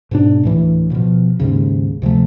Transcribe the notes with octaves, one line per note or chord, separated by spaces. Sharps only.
G#2 B2 D4
D2 A2 E3
B2 F3
D#2 G#2 C#3
D2 C3 F3 A3